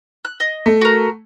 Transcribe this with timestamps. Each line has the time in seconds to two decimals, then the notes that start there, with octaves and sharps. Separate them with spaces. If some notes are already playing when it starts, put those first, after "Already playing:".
0.25 F#6
0.40 D#5
0.66 A3
0.81 F#4 A#4